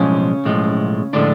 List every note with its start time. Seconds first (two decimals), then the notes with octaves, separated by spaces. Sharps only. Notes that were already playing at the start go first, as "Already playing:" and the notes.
Already playing: B1 A2 C#3 F3 G#3 C#4
0.44 B1 A2 F3 G#3
1.13 A2 D3 F3 G#3 D4